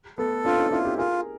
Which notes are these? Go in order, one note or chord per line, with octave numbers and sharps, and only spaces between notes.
A3 B3 A4
C4 D4 F4
C#4 D#4
D4 E4 F4
G4 A4
F4 G#4 A#4